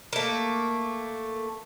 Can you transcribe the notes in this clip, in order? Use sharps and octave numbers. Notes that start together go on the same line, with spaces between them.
A3 A#3